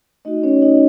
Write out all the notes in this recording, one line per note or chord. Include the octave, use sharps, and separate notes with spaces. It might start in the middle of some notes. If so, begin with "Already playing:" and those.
A3 D#4 F#4 D#5
C#4 C#5
D#4 D#5